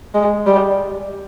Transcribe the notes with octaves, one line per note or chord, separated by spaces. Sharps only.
G#3
G3